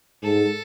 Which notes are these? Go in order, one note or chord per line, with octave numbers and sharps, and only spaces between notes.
G#2 A4